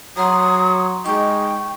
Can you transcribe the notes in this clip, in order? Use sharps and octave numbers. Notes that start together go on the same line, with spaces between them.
F#3 A#5 C6 D#6
G#3 D#4 G5 C#6